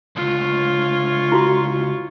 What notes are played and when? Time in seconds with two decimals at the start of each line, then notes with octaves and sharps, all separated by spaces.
0.16 C#2 D3 F4 C#5
1.32 E4 F#4 C6